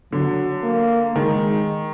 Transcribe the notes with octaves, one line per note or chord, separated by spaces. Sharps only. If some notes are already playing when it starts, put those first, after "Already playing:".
D3 F#3
A#3
D#3 G#3